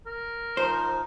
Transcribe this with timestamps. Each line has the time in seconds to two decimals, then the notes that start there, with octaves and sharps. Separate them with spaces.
0.06 A#4
0.57 F3 D#4 C5